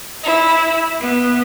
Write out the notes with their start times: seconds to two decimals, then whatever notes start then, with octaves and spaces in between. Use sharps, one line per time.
0.25 E4
1.00 B3